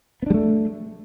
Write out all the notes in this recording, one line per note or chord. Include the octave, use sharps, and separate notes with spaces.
G3 A3 B3 D4